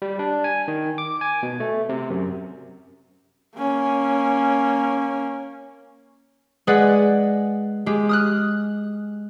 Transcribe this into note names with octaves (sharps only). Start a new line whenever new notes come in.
G3
D4
G#5
D#3
D6
G#5
B2
A3
C3
F#2
A#3 C#4
G#3 G#4 B4 D5 D#5 F#5
G#3 G4
D#6 F6 F#6